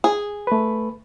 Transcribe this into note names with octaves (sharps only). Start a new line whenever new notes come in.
G#4
A3 B4